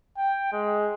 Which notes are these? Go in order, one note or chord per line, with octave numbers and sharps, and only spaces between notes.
G5
G#3